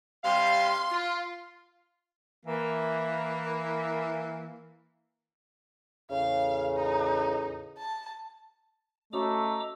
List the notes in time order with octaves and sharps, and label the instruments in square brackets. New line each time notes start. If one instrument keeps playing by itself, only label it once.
[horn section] C3 G3 F5 [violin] C6
[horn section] F4
E3 A#3
[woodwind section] E2 A2 C#3 [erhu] F5
[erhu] D#4
A5
[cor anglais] A3 [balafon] C#4 F#4 C#5 [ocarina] D#5 [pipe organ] A#5 D6 E6